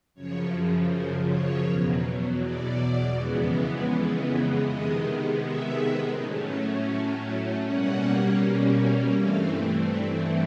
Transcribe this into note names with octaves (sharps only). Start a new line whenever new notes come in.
F#2 C#3 F3 C#5
C5
C#5
E2 B2 F#3
D5
F2 C#3 E3 G#3 B3
C3 D#3 G#3 B3 D#5
E5
A2 F#3 A3 C#4
B2 G3 A#3 C#4 F#5
G2 E3 A3 C4 F5
D5